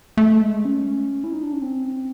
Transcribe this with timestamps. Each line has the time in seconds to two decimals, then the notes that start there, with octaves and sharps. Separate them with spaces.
0.17 A3
0.41 G#3
0.65 C#4
1.24 E4
1.33 D#4
1.43 D4
1.53 C#4
1.62 C4